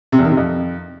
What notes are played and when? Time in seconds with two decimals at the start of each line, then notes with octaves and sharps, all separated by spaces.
0.12 C3
0.19 E2
0.25 D#3
0.31 C3
0.37 F2